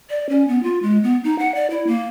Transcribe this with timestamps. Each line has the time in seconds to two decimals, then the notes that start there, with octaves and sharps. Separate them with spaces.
0.10 D5
0.29 C#4
0.48 B3
0.63 F4
0.82 G#3
1.03 B3
1.24 D#4
1.39 F#5
1.55 D5
1.70 E4
1.87 A#3